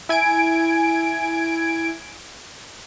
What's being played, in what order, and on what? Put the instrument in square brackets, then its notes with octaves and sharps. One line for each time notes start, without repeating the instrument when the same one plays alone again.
[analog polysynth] E4 G#5 G#6 D7